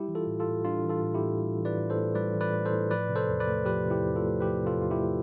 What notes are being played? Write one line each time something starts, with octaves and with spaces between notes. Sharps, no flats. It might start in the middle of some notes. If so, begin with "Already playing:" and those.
Already playing: G3 E4 G4
E3
F4 A4
A2
F4 A4
A2
G3 D4 F4
E3
F4 A4
A2
E4 G4
A2
G3
E3
B4 D5
A2
A4 C5
A2
G3 B4 D5
E3
B4 D5
A2
A4 C5
A2
F3 B4 D5
C3
A4 C5
E2
B4 D5
A3
F3 G4 B4
C3
E4 G4
E2
F4 A4
A3
F3 G4 B4
C3
F4 A4
E2 F4
E4 G4
A3